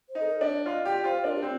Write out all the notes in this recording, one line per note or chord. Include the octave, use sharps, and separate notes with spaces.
C5
D#4 A4
A#4
D4
D5
F4 D#5
G4 D5
F4 C5
D4 A#4
G4
C4 F4